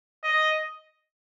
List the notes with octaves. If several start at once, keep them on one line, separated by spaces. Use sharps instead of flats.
D#5